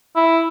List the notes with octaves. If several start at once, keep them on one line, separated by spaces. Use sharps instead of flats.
E4